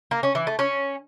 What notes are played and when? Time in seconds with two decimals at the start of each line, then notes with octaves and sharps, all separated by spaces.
0.11 A#3
0.23 C#4
0.35 E3
0.47 A3
0.59 C#4